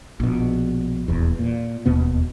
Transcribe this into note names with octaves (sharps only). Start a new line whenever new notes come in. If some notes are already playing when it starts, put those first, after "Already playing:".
A#1 B2
D#1 E2
A#2
E1 D#2 B2 B3